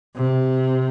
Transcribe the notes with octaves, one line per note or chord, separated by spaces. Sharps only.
C3